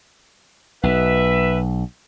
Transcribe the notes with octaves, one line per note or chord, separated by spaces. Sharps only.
B1 B4 E5